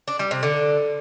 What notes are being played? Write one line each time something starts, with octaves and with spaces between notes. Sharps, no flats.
D4
G3
C3
D3